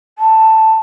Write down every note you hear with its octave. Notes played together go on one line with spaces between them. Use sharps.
A5